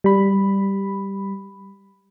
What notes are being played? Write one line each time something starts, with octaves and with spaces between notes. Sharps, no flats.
G3 B5